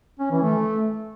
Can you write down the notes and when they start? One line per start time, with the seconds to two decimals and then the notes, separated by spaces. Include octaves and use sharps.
0.19 C#4
0.31 E3
0.42 A3